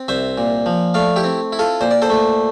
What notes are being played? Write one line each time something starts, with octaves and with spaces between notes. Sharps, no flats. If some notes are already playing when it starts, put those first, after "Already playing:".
Already playing: C4
C2 C5 E5
A#2
F3
A3 D5 F5
E4 G4
C4
E4
F4 A4
A#2 C5
D5
A4 C5
A3